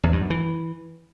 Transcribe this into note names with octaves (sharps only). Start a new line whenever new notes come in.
E2
G2
F#2
E3